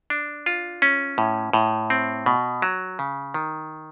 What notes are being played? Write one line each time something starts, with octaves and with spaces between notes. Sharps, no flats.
D4
F4
C#4
A2
A2
C4
B2
F#3
C#3
D#3